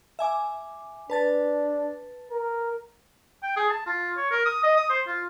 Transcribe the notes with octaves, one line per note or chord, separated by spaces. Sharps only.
E5 G#5 D6
D4 B4 A5 A6
A#4
G5
G#4
A5
F4
C#5
A#4
D#6
D#5
D#6
C5
F4